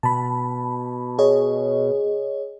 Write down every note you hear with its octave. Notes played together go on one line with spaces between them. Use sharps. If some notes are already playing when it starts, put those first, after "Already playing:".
B2 A5 B5
G#4 C#5 D#5